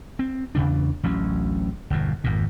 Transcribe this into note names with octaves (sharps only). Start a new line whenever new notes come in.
C4
E2 C#3 E3 D4
A1 D2 F#3 C#4
G1 E2 B2
G#1 F2 A#2